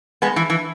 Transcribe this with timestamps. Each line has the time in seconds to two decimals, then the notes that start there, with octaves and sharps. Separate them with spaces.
0.22 G#3 B3
0.36 E3
0.50 E3